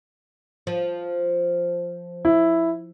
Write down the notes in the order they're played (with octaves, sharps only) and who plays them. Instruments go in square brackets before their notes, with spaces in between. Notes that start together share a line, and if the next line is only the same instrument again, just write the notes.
[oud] F3
[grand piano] E4